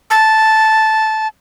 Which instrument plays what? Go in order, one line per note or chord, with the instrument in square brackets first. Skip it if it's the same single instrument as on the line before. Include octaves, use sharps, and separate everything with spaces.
[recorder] A5